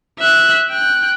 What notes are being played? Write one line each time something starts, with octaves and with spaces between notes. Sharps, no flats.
E5 F#6
G5 F#6